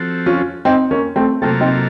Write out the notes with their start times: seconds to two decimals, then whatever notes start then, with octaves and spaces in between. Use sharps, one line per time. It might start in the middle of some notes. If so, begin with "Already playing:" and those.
Already playing: F3 C4 F#4 A4
0.26 C#4 F4
0.65 C4 D#4
0.91 A#3 C#4
1.16 A3 C4
1.42 C3 F#3 A3 A#3 C4 F4 A4
1.60 C4 D#4